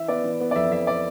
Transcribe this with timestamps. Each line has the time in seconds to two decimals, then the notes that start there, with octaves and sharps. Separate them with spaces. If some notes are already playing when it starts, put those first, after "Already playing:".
Already playing: E3 E5
0.08 B3 D5
0.24 E3
0.40 B3
0.51 D5
0.56 F2 E5
0.71 F2 E5
0.87 D5